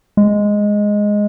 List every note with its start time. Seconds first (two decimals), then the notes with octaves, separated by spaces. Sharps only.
0.17 G#3